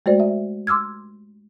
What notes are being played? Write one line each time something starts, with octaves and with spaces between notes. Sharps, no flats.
G#3 A3 F#4 C5 D5
E5
C6 D6 E6 F6 G#6